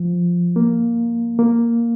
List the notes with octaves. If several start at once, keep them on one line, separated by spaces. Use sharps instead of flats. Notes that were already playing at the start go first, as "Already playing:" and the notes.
Already playing: F3
A#3
A#3